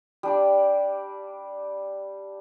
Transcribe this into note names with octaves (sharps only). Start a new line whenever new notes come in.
G3 D4 D5